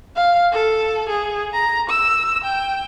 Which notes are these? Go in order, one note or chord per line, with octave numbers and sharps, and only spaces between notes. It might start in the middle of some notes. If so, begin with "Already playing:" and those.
F5
A4
G#4
A#5
E6
G5